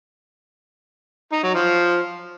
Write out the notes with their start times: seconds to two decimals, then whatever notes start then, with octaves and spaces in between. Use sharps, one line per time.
1.32 D#4
1.43 F#3
1.54 F3